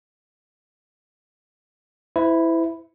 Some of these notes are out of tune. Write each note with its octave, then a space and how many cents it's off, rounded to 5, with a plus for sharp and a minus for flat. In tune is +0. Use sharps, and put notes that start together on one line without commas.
E4 +0 C5 -45